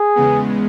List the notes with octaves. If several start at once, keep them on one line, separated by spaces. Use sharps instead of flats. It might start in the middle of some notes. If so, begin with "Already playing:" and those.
Already playing: G#4
E2 C#3 G#3 B3